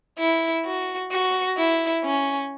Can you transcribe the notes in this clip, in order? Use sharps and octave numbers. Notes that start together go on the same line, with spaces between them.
E4
F#4
F#4
E4
C#4